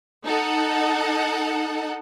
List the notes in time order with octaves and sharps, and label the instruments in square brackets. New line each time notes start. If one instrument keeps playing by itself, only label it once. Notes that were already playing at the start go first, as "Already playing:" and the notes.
[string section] D#4 A4 F#5